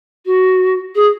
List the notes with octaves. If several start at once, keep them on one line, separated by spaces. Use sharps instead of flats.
F#4
G#4